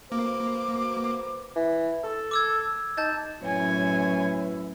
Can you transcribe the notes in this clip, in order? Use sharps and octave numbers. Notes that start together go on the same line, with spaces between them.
A#3 F#4 B4 C5 D6
E3
A4
D6 E6 G#6
D#4 A5 G6 A6
F#2 A2 E4 B4 C#5 G#5